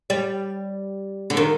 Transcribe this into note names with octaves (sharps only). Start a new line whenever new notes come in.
G3
D3
D#3